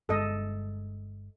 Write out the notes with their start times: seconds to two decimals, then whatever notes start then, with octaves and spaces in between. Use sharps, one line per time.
0.09 G1 G2 G#3 A4 D#5